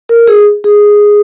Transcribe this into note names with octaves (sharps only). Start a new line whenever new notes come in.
A#4
G#4
G#4